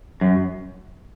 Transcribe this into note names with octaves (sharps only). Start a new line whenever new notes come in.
F#2